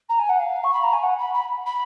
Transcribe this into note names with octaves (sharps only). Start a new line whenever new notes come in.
A#5
G#5
F#5
F5
C#6
B5
A#5
G#5
F#5
B5
B5
B5